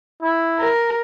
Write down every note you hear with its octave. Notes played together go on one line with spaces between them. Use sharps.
E4
A#4